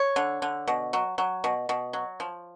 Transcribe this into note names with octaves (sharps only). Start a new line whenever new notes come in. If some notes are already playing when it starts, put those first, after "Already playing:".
Already playing: C#5
D3
D3
B2
F#3
F#3
B2
B2
F#3
F3